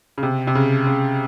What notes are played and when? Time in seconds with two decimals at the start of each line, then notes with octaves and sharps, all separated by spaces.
0.18 C#3
0.23 C3
0.47 C3
0.55 C#3
0.87 C#3